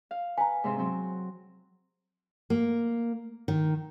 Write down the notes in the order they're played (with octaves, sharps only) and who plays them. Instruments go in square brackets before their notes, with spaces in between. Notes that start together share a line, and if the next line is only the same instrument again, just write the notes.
[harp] F5
[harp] B4 [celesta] G#5 A#5
[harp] G#2 C3 C4
F#3 C4
[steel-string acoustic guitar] A#3
D#3